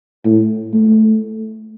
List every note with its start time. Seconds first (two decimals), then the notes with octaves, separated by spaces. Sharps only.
0.25 A2
0.74 A3